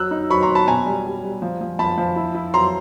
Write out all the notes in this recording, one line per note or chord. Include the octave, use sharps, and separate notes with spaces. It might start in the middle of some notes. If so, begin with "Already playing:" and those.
Already playing: F#3 E6 F#6
D#4
F#3 B5 C#6
A#5 C6
F#3
A5 B5
B2 G#5 A#5
G3
G3
G3
F3
F3
F3 A5 B5
F3
E4
E4
F#3 A#5 C6